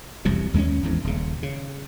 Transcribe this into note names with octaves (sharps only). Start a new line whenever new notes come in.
E1 C2 F2 C3
D#2 G#3 A3 C#4
G#1 E2 G#2
D#1 C#3
C#3